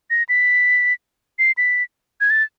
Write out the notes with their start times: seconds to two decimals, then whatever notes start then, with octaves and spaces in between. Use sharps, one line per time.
0.10 A#6
0.29 B6
1.39 C7
1.58 B6
2.21 G#6
2.30 A6